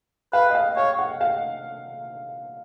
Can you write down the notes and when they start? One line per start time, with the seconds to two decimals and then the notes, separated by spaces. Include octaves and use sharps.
0.33 B4 F5
0.50 D#5
0.55 F5
0.77 C#5 F5
0.99 F#5
1.21 F5